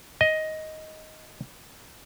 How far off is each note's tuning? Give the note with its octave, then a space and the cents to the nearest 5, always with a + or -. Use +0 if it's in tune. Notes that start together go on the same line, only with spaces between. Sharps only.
D#5 +10